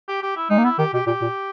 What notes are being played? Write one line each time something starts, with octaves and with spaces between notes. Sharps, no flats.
G4
G4
E4
G#3 D#4
A#3
B3 E4
D#3 G4
B2 G4
A#2 G4
A#2